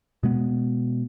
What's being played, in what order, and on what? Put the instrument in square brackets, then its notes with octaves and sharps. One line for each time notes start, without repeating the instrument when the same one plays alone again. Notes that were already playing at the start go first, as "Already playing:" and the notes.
[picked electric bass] B2 G#3 B3